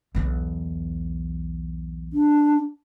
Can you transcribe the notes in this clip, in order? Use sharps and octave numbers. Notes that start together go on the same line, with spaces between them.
B1 E2
D4